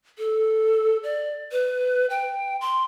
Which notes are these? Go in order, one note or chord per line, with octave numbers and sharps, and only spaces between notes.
A4
D5
B4
G5
C6